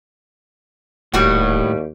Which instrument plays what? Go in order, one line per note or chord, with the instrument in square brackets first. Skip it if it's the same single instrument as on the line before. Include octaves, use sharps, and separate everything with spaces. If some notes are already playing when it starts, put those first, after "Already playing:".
[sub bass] D#1 [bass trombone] D#2 [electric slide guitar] A2 [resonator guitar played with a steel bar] G3 F#4 F#5